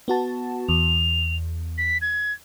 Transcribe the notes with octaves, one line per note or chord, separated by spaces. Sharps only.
B3 F#4 A5
E2 F7
B6
G#6